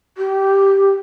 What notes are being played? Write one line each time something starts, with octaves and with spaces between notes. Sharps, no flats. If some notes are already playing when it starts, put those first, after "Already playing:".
G4